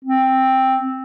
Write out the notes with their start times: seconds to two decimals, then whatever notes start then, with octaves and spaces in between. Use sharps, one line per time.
0.05 C4